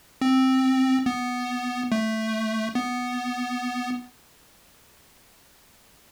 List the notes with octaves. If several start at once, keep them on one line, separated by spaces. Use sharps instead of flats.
C4
B3
A3
B3